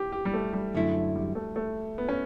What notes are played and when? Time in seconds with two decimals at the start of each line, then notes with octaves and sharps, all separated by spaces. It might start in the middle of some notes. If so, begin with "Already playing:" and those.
Already playing: G4
0.12 G4
0.25 G3
0.34 A3
0.53 G3
0.75 F#2 D3 A3 E4
0.94 F#3
1.15 G3
1.35 A3
1.56 A3
1.98 B3
2.09 C#4